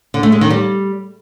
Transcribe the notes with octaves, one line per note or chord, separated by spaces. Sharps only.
D3
A3
G#3
D#3
G3